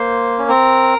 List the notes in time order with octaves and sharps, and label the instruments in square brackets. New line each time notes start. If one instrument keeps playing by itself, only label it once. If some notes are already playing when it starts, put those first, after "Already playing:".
Already playing: [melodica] A#3 [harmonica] C5
[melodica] C#4
[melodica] C4 [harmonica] A#4